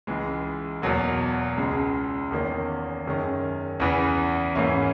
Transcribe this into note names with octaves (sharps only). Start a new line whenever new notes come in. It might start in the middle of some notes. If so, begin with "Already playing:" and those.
C#2 C#3 E3 G#3
E2 B2 F#3 A#3
C#2 C#3 G#3
E2 D#3 A#3 C#4
F#2 D#3 G#3 C#4
E2 C#3 E3 B3
G#2 E3 A#3 C#4 E4